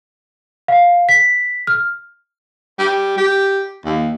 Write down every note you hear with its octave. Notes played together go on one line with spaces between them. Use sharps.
F5
B6
F6
G3
G4
D#2